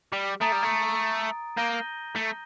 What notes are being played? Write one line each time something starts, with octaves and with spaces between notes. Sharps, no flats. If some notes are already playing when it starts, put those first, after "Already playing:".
G3
A3 A#5 D#6 A6 D7
G3
A3
A#3 G6 A#6 D#7 G7
A3